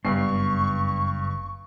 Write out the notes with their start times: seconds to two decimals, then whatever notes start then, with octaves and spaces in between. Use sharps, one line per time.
0.05 F#1 G2 B3 D4 C#6 C7